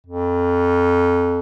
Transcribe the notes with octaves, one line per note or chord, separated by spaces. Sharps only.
F2